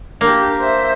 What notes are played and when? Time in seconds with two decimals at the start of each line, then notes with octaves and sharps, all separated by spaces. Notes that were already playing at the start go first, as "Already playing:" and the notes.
0.21 A#3 D4 G4
0.60 C5 E5